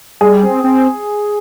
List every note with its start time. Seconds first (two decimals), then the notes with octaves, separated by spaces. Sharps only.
0.21 G3 G#4
0.43 C4
0.64 C4